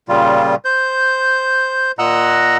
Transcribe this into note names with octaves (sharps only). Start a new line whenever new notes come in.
A#2 C#3 G3 F4
C5 G6
A#2 D#5 F#5 A#5 E6 F#6